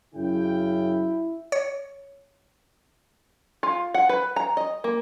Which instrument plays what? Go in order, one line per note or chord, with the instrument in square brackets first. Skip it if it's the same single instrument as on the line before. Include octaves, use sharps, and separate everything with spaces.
[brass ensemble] F#2 C#3 G5 [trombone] E4
[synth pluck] C#5
[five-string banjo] F4
F#5
B4
A#5
D#5
A#3